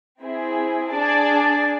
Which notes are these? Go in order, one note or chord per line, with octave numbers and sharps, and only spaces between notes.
C4 E4 G#4
D4 G#4 D5 A5